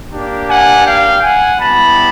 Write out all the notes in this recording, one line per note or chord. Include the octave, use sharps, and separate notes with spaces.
A#3 D4 G4
F#5 G#5
F5 G5
F#5 G#5
G3 B3 E4 G4 A5 B5